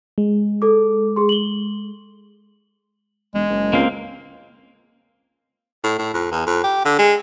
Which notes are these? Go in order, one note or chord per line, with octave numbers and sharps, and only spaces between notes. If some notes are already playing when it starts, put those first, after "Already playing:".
G#3
A4 D6
G#4 C6
F#7 G7
E1 G#3
F#1
C#2 A#3 C4 F5
A2
A2
F2
E2
F2
G4
D3
G#3